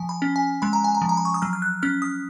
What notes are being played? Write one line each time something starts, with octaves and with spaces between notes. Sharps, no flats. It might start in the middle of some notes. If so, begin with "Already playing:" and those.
Already playing: F3 G#5
B5
C#4
G#5
G#3 B5
A#5
G#5
A#5
F3
A#5
B5
C#6
D#6
F#3 F6
F6
F#6
C#4 F6
D#6